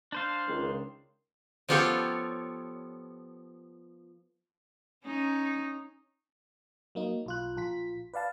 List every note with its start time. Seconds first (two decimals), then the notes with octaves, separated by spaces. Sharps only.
0.12 D4 C5 F5
0.47 C#2 D#3
1.69 F3 B3 F4 G4 A4 C#5
5.04 C#4 D#4
6.95 F#3 A#3 D#4
7.26 B1 F4 F#6
7.57 A#1 F4 B6
8.14 B4 D5 F5 A5